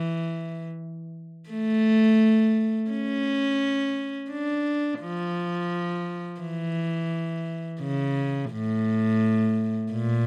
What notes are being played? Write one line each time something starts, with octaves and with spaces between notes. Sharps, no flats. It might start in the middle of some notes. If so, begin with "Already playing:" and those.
Already playing: E3
A3
C#4
D4
F3
E3
C#3
A2
A#2